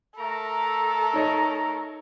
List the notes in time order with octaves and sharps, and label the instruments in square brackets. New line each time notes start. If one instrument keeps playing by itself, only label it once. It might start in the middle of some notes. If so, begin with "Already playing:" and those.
[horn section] A3 A#4 A#5 [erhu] A4
[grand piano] D#4 C#5 D#5